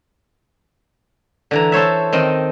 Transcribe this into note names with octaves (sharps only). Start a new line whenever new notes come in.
D3 E3 A#5
A4 C5 C#5 E5
D#3 C4 D#5